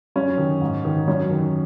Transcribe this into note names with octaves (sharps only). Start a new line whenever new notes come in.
F#2 C#4
D#3
G#2
D#3
F#2 C#4
D#3